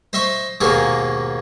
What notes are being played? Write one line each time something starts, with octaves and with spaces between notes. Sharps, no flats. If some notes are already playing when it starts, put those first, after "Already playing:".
C5 D#5 E5 C6 C#6
D#2 G#2 B2 A#3 G#4 C#6